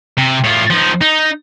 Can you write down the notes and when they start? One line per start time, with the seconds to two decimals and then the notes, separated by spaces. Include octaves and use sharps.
0.18 C3
0.44 A2 F4
0.70 F3 D#4
1.01 D#4